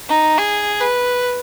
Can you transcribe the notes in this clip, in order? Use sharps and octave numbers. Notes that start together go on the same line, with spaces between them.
D#4
G#4
B4